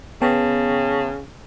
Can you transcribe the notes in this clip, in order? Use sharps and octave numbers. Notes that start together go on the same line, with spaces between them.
C#3 B3 G5 A5